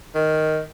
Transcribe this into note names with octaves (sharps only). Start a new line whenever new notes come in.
D#3